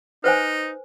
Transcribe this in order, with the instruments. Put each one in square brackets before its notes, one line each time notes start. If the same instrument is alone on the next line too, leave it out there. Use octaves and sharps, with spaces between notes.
[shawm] D#4 [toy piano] B4 C5 G#5